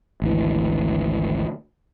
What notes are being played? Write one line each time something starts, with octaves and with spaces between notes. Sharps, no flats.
G#1 D2 E3